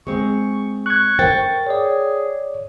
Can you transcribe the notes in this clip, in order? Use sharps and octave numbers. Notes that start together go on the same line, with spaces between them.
G#3 C4 C#6
C#6 F#6 G#6
A#4 C5 G5 A6
G#4 C#5 D5